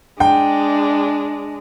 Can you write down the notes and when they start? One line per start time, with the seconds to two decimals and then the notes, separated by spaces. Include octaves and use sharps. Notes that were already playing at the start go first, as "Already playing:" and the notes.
0.20 G#3 D4 G5